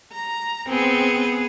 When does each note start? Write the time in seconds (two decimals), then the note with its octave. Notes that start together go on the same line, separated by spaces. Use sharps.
0.12 A#5
0.69 B3 C4 G#4